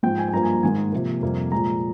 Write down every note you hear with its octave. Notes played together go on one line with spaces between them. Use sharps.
G#2 F3 G#3 G5
G#5
G#5
G2 F3 A#3 A#5
G#5
A#5
G#2 D#3 G#3 G#5
C3 F3 A#3
F2 C3 G3 A#3
A#2 F3 G#3 A#5